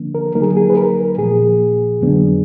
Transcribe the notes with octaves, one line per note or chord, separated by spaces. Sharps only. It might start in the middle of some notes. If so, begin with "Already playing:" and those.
Already playing: D3 F3 A#3 D4
A#4
D3 F#3 A#3 D#4 A#4
G#4
G#4
B4
A#4
A#2 F3 A#3 G#4
F2 D3 F#3 B3 D4